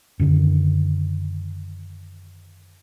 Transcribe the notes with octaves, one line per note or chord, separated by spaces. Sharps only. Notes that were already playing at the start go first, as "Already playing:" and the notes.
F#2 D3 D#3